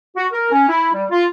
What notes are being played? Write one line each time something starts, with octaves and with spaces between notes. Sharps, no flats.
F#4
A#4
C#4
E4
G3
F4